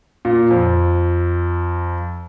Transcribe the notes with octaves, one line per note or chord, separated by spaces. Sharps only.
A#2
F2